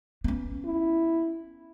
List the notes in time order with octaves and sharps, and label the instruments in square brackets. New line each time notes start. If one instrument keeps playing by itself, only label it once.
[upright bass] B3 C#4
[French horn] E4